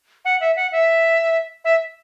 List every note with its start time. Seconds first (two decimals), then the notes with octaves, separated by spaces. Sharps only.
0.25 F#5
0.41 E5
0.56 F#5
0.72 E5
1.65 E5